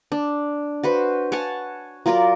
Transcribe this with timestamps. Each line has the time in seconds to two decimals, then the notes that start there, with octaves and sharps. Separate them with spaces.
0.12 D4
0.83 F#4 B4 C5
1.32 C#5 F#5 G#5 A5
2.06 F#3 F4 A#4 D5